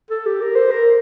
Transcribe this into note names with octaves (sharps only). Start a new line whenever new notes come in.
A4
G4
A#4
C5
A#4